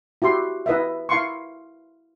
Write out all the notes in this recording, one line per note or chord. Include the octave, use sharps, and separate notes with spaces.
E4 F#4 G4 C6
E4 B4 D#5 E5
E4 F5 C6 C#6